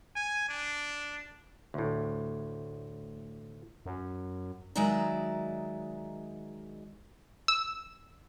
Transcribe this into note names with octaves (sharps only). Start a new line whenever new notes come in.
G#5
D4
D2 A2
F#2
D#3 F#3 G#3 D5 E5 A#5
E6